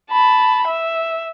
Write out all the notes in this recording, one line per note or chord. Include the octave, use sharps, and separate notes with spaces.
A5 B5
E5